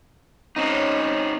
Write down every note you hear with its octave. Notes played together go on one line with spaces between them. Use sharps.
C4 C#4 D#4 C#5